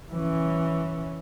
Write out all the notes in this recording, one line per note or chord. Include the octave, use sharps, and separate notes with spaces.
E3 C#4